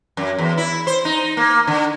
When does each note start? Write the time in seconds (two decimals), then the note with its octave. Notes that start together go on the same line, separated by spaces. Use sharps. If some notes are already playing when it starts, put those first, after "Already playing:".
0.17 F#2
0.39 E2
0.57 E4
0.87 C5
1.05 D#4
1.37 A#3
1.67 D3